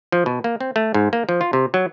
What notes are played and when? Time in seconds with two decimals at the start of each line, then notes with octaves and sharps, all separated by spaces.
0.12 F3
0.26 B2
0.44 A#3
0.60 C4
0.76 A3
0.94 G#2
1.13 A#3
1.29 F3
1.41 F4
1.53 C3
1.74 F#3